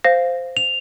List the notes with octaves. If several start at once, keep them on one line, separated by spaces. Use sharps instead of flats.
C5 F5 A#6
F7